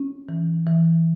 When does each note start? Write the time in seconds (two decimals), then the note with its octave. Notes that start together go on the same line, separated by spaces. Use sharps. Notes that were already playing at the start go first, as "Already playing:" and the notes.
Already playing: C#4
0.29 E3
0.67 E3